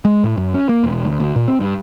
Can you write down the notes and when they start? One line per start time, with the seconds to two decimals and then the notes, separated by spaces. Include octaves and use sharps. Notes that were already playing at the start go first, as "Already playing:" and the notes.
0.05 G#3
0.24 A2
0.37 F#2
0.54 C#4
0.69 A#3
0.84 E1
1.05 D2
1.20 D2
1.36 A#2
1.48 C4
1.60 G2